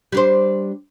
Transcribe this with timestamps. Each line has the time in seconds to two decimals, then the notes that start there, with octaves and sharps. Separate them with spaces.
0.12 G3 D4 C5